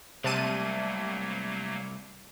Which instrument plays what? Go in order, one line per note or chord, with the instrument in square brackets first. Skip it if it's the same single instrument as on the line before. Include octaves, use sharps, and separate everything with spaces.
[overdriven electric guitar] C2 [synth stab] C3 A5 D#7 [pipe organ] F#3 A3 A#3